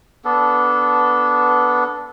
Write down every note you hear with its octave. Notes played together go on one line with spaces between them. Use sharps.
B3 D4 A4